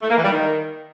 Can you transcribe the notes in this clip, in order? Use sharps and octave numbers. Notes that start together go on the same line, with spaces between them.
A3
A#3
E3
G3
D#3